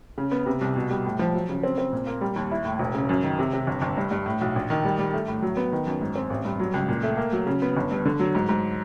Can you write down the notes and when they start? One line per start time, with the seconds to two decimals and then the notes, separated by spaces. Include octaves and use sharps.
0.18 C#3
0.31 B3
0.46 C3
0.61 C2
0.76 B2
0.90 G3
1.05 A2
1.19 F3
1.34 F#3
1.49 C#3
1.63 C4
1.78 C4
1.93 A#2
2.07 A#3
2.21 G3
2.36 D#2
2.51 E4
2.65 A2
2.79 E1
2.95 C#3
3.09 F#2
3.24 D#3
3.39 C3
3.53 C3
3.67 G1
3.82 G1
3.97 G2
4.11 G2
4.26 A2
4.41 B1
4.56 A#1
4.70 D#3
4.85 G3
4.99 G3
5.13 A3
5.28 A2
5.42 F#3
5.57 B3
5.72 D#3
5.86 F#2
6.01 G#2
6.15 C4
6.30 A1
6.45 G2
6.60 F#3
6.74 C#2
6.88 A#2
7.03 A3
7.17 A#3
7.33 F#3
7.47 C#3
7.62 B3
7.77 G1
7.91 G2
8.05 D3
8.20 F#3
8.35 G#2
8.49 G#2